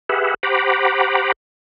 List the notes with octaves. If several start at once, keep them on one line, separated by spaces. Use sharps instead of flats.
G4 G#4 B4 E5 F#5
G4 C5 F#5 A#5 B5 D6